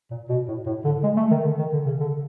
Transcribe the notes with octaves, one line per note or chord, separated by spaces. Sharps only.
A#2
B2
A2
A2
D3
G#3
A3
D#3
D3
D#3
D3
C#3
D3